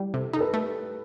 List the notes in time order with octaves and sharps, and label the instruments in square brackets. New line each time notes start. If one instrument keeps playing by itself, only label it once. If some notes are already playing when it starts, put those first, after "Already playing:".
Already playing: [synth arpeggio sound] G3 [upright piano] E4 G4
[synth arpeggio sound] C3 [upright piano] A4
[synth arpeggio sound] D#4 [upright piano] A4
[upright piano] B4
[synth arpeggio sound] A3